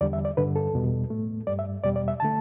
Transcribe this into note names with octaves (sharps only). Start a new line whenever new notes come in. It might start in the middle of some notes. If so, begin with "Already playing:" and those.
E2 D3 G3 D5
E5
D5
G2 D3 G3 B4
A4
E2 B2 G3
A2 A3
G2 G3 D5
E5
E2 B2 G3 D5
D5
E5
D3 A3 A5